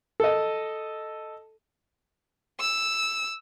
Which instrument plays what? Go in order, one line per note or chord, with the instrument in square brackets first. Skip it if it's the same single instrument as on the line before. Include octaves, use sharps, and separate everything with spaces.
[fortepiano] A4 D#5
[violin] E6